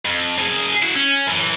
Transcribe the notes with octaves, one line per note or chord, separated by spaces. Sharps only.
F2
F#2 G#4
E4 F#4
C#4
F#2 E3